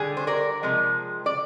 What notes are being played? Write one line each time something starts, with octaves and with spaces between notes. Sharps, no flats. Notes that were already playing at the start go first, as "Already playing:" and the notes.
Already playing: D3 G3 G#4
C5
A#4 D5
C3 F3 G#3
D5